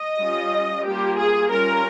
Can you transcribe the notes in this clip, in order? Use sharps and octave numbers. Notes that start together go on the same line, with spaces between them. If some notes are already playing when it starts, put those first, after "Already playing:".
Already playing: D#5
G3 C#4 F4
G3 A#3 F4 G4
G#4
G3 C#4 F4 A#4